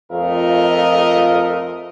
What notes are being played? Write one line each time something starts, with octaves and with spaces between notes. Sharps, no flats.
F2 A3 F4 A#4 D#5